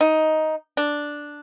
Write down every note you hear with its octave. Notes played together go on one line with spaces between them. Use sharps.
D#4
D4